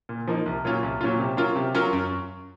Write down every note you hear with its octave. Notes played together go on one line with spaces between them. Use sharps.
A#2
F3 A#3 D#4
C2
A#2 F#3 C#4 F4
C2
A#2 F#3 C#4 F4
C3
F#3 C#4 F4 A#4
C3
F#3 C#4 F4 A#4
F#2